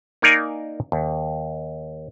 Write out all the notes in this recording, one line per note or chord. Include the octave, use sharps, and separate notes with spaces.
A#3 D#4 A#4 D5 F5 G#5
D#2